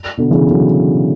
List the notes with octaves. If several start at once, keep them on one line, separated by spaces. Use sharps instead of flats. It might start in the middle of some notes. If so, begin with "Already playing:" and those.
B2 D3
C#3 E3
D3 F#3